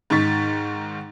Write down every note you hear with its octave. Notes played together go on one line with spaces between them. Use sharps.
G#2 D#3 D#4 C#6 A6 B6